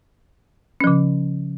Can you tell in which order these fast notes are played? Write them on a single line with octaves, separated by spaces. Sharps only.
C#4 F3 C#3